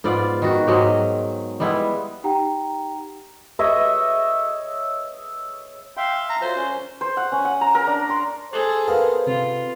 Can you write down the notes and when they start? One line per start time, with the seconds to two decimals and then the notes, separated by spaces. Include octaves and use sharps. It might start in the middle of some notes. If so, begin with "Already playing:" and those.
0.04 G#2 B3 F4 D5
0.42 D#3 F#4
0.67 G#2 F#3 G#3 G4
1.60 G3 G#3 B3 E4
2.23 D#4 G4 F#5 G5 A#5
3.59 C#5 D#5 E5
5.97 E5 F5 G5 C6
6.30 A#5
6.42 F#3 F4 C5
6.56 C#4
7.01 C5
7.17 F#5
7.32 C#4
7.45 F#5
7.61 A#5
7.75 A#4
7.87 D4
8.10 C6
8.53 G#4 A4 C5
8.88 B3 A#4 F5
9.26 C3 F4